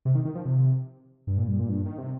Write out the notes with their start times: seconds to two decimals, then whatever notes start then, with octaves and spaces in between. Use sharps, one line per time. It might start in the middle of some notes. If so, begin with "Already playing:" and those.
0.05 C3
0.15 D#3
0.25 D#3
0.35 F3
0.45 C3
1.27 G2
1.38 A#2
1.48 G2
1.59 A#2
1.69 G2
1.86 D#3
1.98 C3